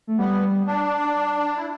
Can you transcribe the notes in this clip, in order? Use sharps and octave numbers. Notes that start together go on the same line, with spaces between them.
A3
G3 B3
D4
E4